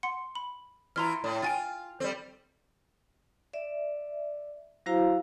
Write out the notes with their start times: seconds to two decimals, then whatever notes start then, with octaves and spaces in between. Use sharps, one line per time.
0.03 F#5 C6 C#7
0.35 B5
0.96 E3 E4 F4 A#5 C6 F6
1.24 A2
1.42 F4 G5 G#5 A6
2.00 G3 C4 A4
3.53 D5 E5
4.86 F#3 E4 F#4 C5 F5 A#5